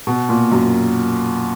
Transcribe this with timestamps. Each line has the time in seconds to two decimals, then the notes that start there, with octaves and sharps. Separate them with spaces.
0.07 B2
0.29 A#2
0.51 F#2